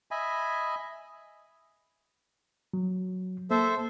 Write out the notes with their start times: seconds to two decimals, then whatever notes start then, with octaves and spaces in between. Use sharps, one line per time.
0.11 D#5 E5 G#5 B5
2.73 F#3
3.51 A#3 A4 C5 E5